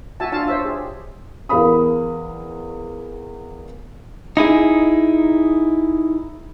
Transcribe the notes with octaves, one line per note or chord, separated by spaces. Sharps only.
F#4 E5 G#5 A5
D4 F4 F5 A5
C5 C#5 E5
G4 G#4
E2 A#4 F5 B5 D#6
D#4 E4 G#4